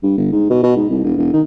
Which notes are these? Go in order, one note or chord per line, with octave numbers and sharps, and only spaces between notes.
G2
G1
G#2
B2
B2
G#2
C2
E1
E1
D#3